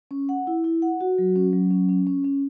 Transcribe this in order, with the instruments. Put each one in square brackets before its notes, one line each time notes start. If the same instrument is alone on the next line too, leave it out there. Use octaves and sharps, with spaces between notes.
[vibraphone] C#4
F#5
E4
E4
F#5
F#4
F#3
C#4
F#3
C#4
C#4
C#4
C#4